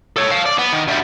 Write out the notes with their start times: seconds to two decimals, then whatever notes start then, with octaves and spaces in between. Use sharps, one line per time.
0.17 A4 C#5
0.31 F5 A5
0.46 D5
0.58 B3
0.73 D#3
0.88 D2 G3